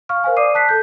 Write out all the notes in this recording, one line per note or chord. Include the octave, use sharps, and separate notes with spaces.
F5 C#6 F6
A#4 C5 F5 G#5
D5 D6 D#6 C7 D#7
A5 F#6 B6 C7
A4 G6